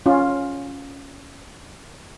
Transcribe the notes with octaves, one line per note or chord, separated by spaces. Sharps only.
C#4 F4